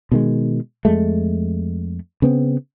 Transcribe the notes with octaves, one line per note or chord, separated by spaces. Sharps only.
B2 D#3 G#3
F2 G#3 A3
C#3 B3 C4